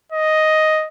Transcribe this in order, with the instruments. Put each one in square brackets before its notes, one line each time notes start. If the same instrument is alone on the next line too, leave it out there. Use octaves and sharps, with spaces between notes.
[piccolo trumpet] D#5